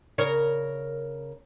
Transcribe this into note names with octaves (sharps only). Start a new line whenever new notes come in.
C#3 A#4 C#5